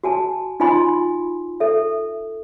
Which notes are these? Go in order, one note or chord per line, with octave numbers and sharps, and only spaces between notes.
F#4 G#5 A5
D#4 F4 D#5 G#5 B5 C6
A4 E5